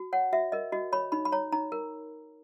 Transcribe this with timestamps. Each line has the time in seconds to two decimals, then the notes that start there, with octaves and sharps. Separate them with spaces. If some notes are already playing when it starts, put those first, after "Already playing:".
Already playing: F#4
0.13 C#5 F#5
0.33 F#4 E5
0.52 A#4 D#5
0.72 F#4 D#5
0.92 C#5 B5
1.12 D#4 B5
1.25 B5
1.32 C#5 A#5
1.52 D#4 A#5
1.72 A#4